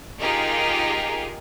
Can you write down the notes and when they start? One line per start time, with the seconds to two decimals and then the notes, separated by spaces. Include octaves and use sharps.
0.20 D#4 F4 G4 G#4 A#4